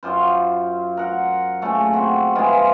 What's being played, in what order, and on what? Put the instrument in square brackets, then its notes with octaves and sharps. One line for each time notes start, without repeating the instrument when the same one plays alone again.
[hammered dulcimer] F#2 F4 C5
A#4 F#5
A#2 C#3 A3 C#5
C4 F#4
E3 F3 G#3 F4